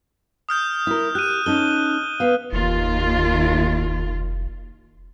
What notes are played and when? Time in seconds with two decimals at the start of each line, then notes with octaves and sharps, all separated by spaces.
0.49 D#6 F6 G6
0.87 E4 A#4
1.15 G4 F#6 D#7
1.46 C#4 D#4 A4 G7
2.20 B3 F5
2.52 F1 D#2 F4